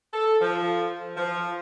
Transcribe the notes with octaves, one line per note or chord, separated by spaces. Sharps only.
A4
F3
F3